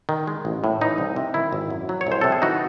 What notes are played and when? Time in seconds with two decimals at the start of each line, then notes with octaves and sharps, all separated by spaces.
0.09 D#3
0.27 G#3
0.45 A1
0.64 A2
0.81 E3 D#4
0.98 C2
1.16 C3
1.34 D#3 E4
1.53 G#1
1.70 F#2
1.89 F#3
2.01 C#5
2.07 C2 C5
2.21 C3 A4
2.32 G#4
2.42 E3 D#4 F#4